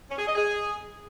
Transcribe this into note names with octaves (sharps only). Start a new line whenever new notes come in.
C#4
G#4
D#5
G#4